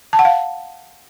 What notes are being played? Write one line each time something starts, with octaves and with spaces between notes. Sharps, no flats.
A5
F#5
F5